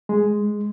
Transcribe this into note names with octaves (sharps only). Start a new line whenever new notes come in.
G#3